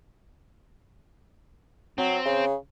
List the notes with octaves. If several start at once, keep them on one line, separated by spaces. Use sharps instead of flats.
F#3 C4
C#3